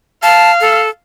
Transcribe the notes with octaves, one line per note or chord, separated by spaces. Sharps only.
F5 A5
A4